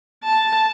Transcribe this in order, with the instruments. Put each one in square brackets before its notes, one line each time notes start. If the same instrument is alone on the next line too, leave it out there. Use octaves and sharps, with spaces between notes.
[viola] A5